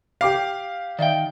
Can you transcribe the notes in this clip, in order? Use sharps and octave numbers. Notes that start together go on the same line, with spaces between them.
G4 F5 D6 C7
D#3 D5 E5 F5 G5